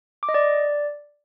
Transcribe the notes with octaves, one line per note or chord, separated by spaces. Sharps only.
D6
D#5
D5